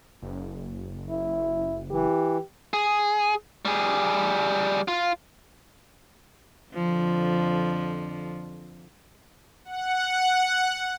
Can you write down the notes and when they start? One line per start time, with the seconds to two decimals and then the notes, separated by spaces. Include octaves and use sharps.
0.22 F#1
1.10 E4
1.91 E3 G4
2.74 G#4
3.65 G3 G#4
4.88 F4
6.73 F2 D3 F3
9.65 F#5